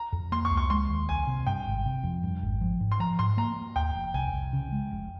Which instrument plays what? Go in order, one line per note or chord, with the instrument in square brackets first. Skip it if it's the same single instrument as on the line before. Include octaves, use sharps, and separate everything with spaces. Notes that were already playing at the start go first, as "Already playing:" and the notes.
Already playing: [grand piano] A#5
[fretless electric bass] F2
[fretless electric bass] A#3 [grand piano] C6
[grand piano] C#6
[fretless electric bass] C#2
[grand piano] C#6
[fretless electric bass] G#3 [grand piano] C6
[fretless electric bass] D#2
[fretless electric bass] C2 [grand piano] G#5
[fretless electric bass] C3
[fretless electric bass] G2 [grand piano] G5
[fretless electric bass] G#1
C3
F2
G2
G#1
F3
G#2
[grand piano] C6
[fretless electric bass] F3 [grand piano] A#5
[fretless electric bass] G#2 [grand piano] C6
[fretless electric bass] A#3 [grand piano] A#5
[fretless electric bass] A#3
[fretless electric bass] D#2 [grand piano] G5
[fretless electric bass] F1
[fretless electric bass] C2 [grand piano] G#5
[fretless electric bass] C2
C#3
G#3
F1